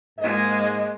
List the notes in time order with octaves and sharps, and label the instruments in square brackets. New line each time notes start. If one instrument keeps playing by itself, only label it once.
[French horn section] G#2 D#5 [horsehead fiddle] G#3 A#3